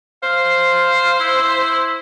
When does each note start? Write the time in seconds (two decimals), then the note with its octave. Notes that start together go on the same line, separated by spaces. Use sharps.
0.23 C5 F5
1.20 E4